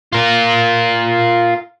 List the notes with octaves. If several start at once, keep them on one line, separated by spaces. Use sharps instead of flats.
F4 A#4